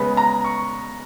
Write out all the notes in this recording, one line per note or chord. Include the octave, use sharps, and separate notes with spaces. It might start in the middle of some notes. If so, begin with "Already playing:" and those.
Already playing: C#3 G#3 B3 B5
A#5
C#6